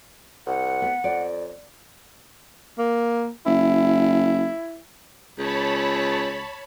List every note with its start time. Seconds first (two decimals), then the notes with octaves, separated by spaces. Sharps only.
0.47 C2 F#5
0.82 B3
1.04 F2 D5
2.78 A#3
3.46 F#1 E4
5.39 C#2 C#5 A5 B5